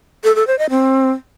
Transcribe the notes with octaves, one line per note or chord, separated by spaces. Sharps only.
A4
A4
C5
D#5
C4